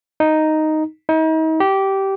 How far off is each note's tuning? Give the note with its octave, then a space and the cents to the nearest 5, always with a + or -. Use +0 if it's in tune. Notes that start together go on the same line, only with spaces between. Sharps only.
D#4 +0
D#4 +40
G4 -15